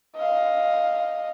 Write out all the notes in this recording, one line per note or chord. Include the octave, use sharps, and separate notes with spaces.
D#5 F5